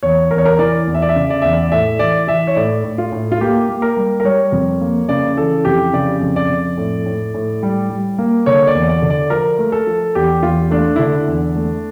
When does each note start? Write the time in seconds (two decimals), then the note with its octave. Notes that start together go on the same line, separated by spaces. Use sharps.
0.03 E2 C#5
0.31 E2 A#4
0.38 C#5
0.46 A#4
0.59 E3 D5
0.87 E2
0.94 E5
1.02 D5
1.09 E5
1.16 C#3
1.30 D5
1.42 E2 E5
1.53 D5
1.72 A2 E5
1.99 E3 D5
2.27 E3 E5
2.47 C#5
2.56 A2 D5
2.84 A2
2.98 F4
3.12 A2
3.32 F4
3.41 A#3 G4
3.69 A#3
3.82 A#4
3.97 G3
4.20 A#4
4.24 G3 C#5
4.52 F2
4.81 A#3
5.09 C#3 D5
5.37 E3 A4
5.65 F2 G4
5.93 C#3 D5
6.21 F2
6.36 D5
6.50 F2
6.77 A2
7.06 A2
7.34 A2
7.63 G3
7.90 G3
8.18 A#3
8.46 D3 C#5
8.67 D5
8.75 E2
8.89 D5
9.02 D3
9.10 D5
9.30 F3 A#4
9.58 A3
9.72 A4
9.87 F3
10.15 E2 G4
10.43 E2 F4
10.71 A3 D4
10.96 E4
10.99 D3 D4
11.28 E2
11.56 A3